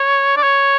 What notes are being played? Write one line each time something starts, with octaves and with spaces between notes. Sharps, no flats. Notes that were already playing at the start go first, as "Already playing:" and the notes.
Already playing: C#5
D5
C#5